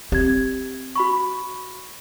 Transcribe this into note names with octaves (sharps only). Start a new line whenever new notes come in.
C4 G4 G#6
F#4 B5 C#6